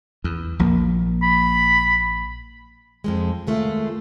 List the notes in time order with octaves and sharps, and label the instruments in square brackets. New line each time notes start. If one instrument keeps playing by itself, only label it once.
[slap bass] E2
A#1 F3 A#3
[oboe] B5
[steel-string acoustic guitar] F2 F3 G#3
D#2 G#3 A3 F4